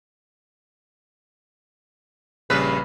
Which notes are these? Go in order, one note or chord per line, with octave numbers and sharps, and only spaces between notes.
A#1 C#3 G3 B4